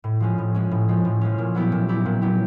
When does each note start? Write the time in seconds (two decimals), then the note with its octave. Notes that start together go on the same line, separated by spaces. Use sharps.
0.04 A2
0.20 F3 G#3 C#4
0.38 A2
0.55 F3 G#3 C#4
0.71 A2
0.88 F3 G#3 C#4
1.05 A2
1.21 F3 G#3 C#4
1.38 A#2
1.55 F#3 B3 E4 G4
1.72 A#2
1.88 F#3 B3 E4 G4
2.06 A#2
2.22 F#3 B3 E4 G4